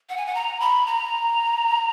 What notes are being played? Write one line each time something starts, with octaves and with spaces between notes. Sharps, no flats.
F#5
G#5
F#5
A#5
B5
A#5